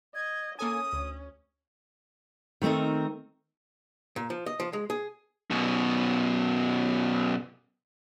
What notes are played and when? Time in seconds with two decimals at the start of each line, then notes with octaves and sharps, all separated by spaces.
0.15 D#5 G#6
0.59 A#3 C#4 A4 G#5 D#6
0.93 D2
2.62 D#3 A3 C4 D#4 A#4
4.16 A#2
4.30 F3
4.46 D#5
4.60 F3
4.73 G#3
4.90 G#4
5.51 F#2 B2